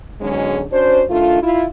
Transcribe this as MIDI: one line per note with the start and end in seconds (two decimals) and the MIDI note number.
0.20 0.63 44
0.20 0.63 47
0.20 0.63 50
0.20 0.63 54
0.20 0.63 56
0.20 0.63 61
0.70 1.02 61
0.70 1.02 62
0.70 1.02 66
0.70 1.02 72
1.09 1.39 51
1.09 1.39 57
1.09 1.39 62
1.09 1.39 65
1.41 1.64 64
1.41 1.64 65